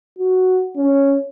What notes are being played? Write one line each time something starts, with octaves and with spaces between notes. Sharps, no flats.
F#4
C#4